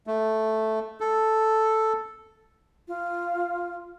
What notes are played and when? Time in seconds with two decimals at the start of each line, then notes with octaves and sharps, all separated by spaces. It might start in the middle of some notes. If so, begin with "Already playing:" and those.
0.07 A3
1.00 A4
2.88 F4